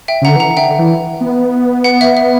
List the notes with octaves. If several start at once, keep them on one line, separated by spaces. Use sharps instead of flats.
E5 G5
C#3
D3 F#5 A#5
E3 F#5 A#5
D3 E5 G5
E3
B3
F#5
E5
E5